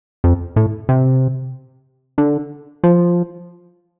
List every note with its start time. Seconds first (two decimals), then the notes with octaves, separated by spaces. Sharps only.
0.24 F2
0.56 A2
0.89 C3
2.18 D3
2.84 F3